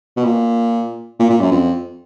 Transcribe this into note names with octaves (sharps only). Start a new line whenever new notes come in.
B2
A#2
A#2
A#2
F#2
F2